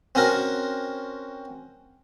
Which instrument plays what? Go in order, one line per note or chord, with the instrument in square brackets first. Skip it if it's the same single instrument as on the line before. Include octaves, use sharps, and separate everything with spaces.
[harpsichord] C4 C#4 F#4 A#4